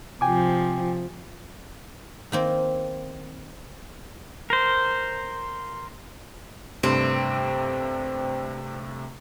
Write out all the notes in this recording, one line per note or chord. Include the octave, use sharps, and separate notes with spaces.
C3 F3 G5 G#5 D6
D#3 A#3 C4
A#4 C5
G2 C3 A3 C4